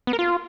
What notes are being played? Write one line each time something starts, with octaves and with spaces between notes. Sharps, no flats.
B3
A#4
F4